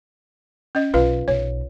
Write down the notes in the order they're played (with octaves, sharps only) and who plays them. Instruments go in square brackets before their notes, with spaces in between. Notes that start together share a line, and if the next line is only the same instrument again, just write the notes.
[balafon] C#4 D#5
[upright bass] B1 [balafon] F4 B4 F5
[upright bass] B1 [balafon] C#5